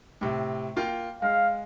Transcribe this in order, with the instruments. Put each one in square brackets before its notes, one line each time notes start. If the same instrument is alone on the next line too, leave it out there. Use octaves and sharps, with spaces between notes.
[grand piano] A2 C3
A#3 F4 G5
[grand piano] G#3 [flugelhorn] F5